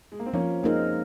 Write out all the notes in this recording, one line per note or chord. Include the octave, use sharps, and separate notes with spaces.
G#3
A#3
C4
F3 A#3 C#4
G#3 A#3 C4 D#4 A#4